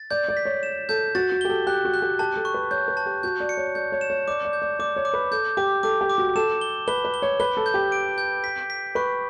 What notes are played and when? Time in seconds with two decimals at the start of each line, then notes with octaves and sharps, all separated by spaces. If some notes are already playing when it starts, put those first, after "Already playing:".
Already playing: A6
0.10 D5 G6
0.29 D5
0.37 B6
0.45 C#5
0.63 E7
0.89 A4 G6
1.15 F#4 A6
1.32 F#4
1.41 G4 G7
1.49 A4
1.67 G4 F#6
1.85 F#4
1.94 F#6
2.02 G4
2.19 G4 A5
2.36 A4
2.45 C#6
2.54 B4
2.71 C#5 G6
2.88 B4
2.97 A5
3.06 G4
3.23 F#4 G6
3.40 D5
3.49 C#7
3.57 C#5
3.75 D5 G6
3.92 C#5
4.01 E7
4.10 C#5
4.28 D5 D6
4.45 D5
4.53 G6
4.62 D5
4.79 D5 D6
4.96 C#5
5.05 D6
5.14 B4
5.32 A4 G6
5.57 G4 D6
5.83 A4 D6
6.01 G4
6.09 D6
6.18 F#4
6.36 A4 E7
6.61 G7
6.88 B4 G7
7.05 B4
7.14 G7
7.22 C#5
7.40 B4 G7
7.57 A4
7.66 G6
7.74 G4
7.92 D7
8.18 G6
8.44 B6
8.70 B6
8.95 B4 C#6